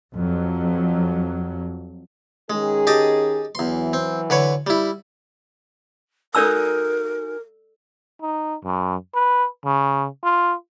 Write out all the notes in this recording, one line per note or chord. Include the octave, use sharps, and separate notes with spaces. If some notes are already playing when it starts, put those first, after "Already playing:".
F2 F#3
D#3 G#3 C#4 G#4
G4 D#5 A5
E2 E3 F#3 C6
C4
D3 B4 C#5
G3 E4
D#4 F#4 A4 A#4 D5 G#5 E6
D#4
F#2
B4
C#3
F4